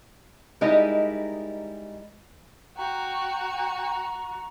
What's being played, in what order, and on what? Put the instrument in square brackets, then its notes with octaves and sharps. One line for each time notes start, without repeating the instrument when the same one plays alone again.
[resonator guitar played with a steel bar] G3 G#3 D#4 E4 A#4 D#5
[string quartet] F#4 [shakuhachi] G5 [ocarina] A#5